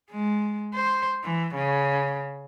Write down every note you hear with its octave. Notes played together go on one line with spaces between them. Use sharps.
G#3
C5
E3
C#3